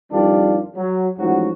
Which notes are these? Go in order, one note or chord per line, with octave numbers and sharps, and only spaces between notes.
F2 D#3 G3 D4 F4 G4
F#3
A1 G#2 F3 F#3 F#4